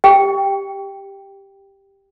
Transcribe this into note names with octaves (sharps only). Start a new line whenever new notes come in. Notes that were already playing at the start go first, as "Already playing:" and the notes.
G4 G5